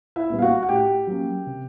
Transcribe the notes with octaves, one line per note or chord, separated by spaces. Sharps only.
E4 E5
A#2 G3 B3
F5
F#4 F#5
F#5
A2 G4 G5
F#3 A#3 C#4
C3